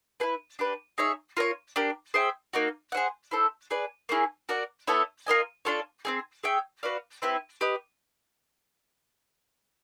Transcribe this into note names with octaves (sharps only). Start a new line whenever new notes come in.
E4 G#4 B4
D4 G4 B4
D#4 G#4 C#5 E5
F4 A#4 C#5
D4 G4 A#4
G#4 C5 E5 G5
A#3 D#4 F#4
G#4 C5 D#5 F#5
E4 A4 C5
G#4 B4 D5
A#3 C#4 E4 G#4
F#4 A#4 D5 F#5
B3 E4 A4 C#5
F4 A#4 D#5 G#5
D4 F4 A4 C#5
C4 D#4 G#4
G#4 C#5 E5 G5
F#4 B4 D5 F5
C4 E4 G4 B4
G4 B4 D#5